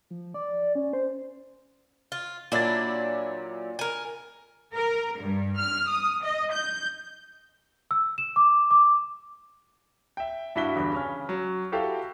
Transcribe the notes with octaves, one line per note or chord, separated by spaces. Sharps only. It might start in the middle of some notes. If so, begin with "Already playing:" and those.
F3
D5
C#4
C5
F4
A#2 F#3 D4 E4 A6
A#4 G#5
A#4
G2
F6
D#6
D#5
G6
E6
E7
D6
D6
E5 G5
G2 E4 F#4 B6 G7
E2 G2 D3 G3
C#3 C#4 F6
F#3
E4 F#4 G4 A4 F5 G5